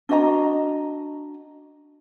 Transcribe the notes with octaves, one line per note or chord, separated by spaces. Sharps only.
D4 F#4 D#5 A#5